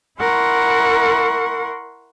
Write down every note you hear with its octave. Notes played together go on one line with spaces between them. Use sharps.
E4 A#4 F#5 C6 C#6